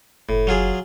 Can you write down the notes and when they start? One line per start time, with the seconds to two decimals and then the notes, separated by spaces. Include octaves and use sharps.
0.29 F#1 A2
0.47 F#3 F4 G#4